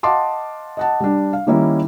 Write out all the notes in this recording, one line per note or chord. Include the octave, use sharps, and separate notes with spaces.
D#5 F5 F#5 A5 C6 D6
D#5 F#5 A5
G3 D4
F5
D#3 G3 A#3 C#4 D#4 E4